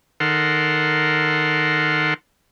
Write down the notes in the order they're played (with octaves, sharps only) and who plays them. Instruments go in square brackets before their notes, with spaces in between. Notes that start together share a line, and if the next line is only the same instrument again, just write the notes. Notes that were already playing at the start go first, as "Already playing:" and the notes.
[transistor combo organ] D#3 A4 A#4 F#5 C6